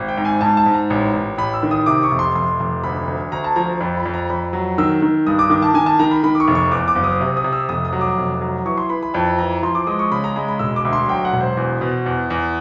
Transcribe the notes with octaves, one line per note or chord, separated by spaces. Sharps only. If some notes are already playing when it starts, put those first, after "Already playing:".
Already playing: G#1
G5
G#2
G#5
G#2 A5
A5
G#2
A#5
A1
A1
A1 B5
E6
D#3
D#6
C3 D6
C#6
F1
C6
F1 C6
F1
D2 B5
D2
D2 A#5
A5
F3 A#5
F2 B5
B5
F2
A#5
F2 B5
F#3
D#3 E6
D#3
G2 D#6
D6
D#3 D6
A5
D#3 G#5
A5
D#3 A#5
B5
D#3 B5
D6
C#6
F1
C#6
E2 D6
D6
F#1
D#6
C3
D#6
C3
E6
F1 D#6
D#6
F#3
D6
F1
F#3
E3 C#6
C6
E3 B5
B5
F2 A5
E3 A#5
F3 C6
D6
G#3 D#6
C#6
C#3 B5
A#5
G#3 B5
B5
E1 E6
D6
D2
C6
F#3 G5
F#5
E1
C5
E2
B2
E2
E2